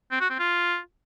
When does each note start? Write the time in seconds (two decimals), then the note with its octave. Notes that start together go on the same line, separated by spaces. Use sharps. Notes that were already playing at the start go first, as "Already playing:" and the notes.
0.12 C4
0.21 F#4
0.30 C4
0.39 F4